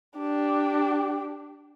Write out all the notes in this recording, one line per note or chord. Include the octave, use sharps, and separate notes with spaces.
D4 G4